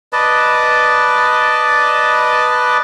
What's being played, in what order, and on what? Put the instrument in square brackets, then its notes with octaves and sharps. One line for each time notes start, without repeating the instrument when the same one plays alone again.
[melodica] B4 D5 D#5 A5